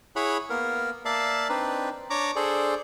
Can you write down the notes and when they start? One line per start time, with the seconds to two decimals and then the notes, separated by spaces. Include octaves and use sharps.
0.16 E4 G#4 C#5 F#5 B5
0.50 A#3 B3 A#4
1.05 A#3 D5 E5 F5 A5
1.49 C4 D4 D#4 B4
2.10 D4 C#5 A#5 D6
2.36 D4 G#4 A4 C5 D5